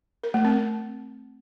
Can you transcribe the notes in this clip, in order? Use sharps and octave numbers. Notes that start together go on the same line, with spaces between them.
A#4
A3
C4